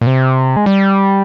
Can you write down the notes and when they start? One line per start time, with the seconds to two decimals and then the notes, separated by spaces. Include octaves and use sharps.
0.01 A#2
0.07 C3
0.56 G#3
0.66 G3